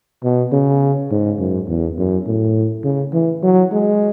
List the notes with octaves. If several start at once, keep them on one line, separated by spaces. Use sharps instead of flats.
B2
C#3
G#2
F#2
E2
F#2
A2
C#3
E3
F#3
G#3